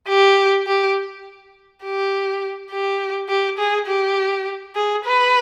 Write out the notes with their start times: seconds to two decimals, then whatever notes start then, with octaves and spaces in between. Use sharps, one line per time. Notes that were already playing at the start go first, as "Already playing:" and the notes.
0.08 G4
0.67 G4
1.84 G4
2.71 G4
3.29 G4
3.58 G#4
3.87 G4
4.75 G#4
5.05 B4